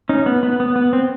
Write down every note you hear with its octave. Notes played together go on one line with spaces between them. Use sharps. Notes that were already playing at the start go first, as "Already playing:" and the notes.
C#4 D#4
B3
B3
B3
B3
C4